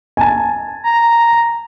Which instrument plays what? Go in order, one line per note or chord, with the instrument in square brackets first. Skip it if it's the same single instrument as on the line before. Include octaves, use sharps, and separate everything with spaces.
[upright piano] G#5 A5
[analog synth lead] A#5